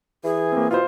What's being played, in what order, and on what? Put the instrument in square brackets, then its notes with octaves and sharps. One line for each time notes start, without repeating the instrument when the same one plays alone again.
[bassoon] E3 [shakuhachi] G#4
[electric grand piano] A#3 C4
[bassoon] B2 [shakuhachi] E4 [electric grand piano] F4 C5